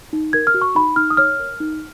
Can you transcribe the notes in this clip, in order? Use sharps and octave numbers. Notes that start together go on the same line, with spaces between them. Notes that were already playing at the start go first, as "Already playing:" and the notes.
D#4
A#4 G#6
F6
F#4
C#6
D#4 B5
D#4 F6
D#6
C#5 F6
A#4
D#4